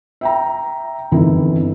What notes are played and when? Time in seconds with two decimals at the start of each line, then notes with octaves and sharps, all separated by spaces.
0.21 E5 G5 A#5
1.12 G1 C3 D#3 E3 E4